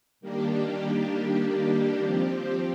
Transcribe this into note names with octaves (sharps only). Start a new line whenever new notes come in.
D#3 G3 A#3 D4 G4
F3 C4 G4